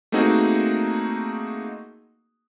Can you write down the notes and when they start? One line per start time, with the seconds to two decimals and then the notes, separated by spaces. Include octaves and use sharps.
0.12 A3 A#3 C4 D#4 F#4 G#4